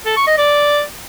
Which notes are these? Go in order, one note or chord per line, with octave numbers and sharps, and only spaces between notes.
A4
C#6
D#5
D5